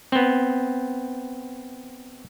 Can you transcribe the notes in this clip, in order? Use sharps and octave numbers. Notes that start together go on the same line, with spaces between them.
B3 C4